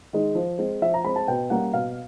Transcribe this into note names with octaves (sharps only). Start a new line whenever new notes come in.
D#3 G#3
F3
G#3 C4
F3 E5
A#5
G#3 C4 B5
A5
B2 G5
G3 A#3 C#4 F#5
B2 F5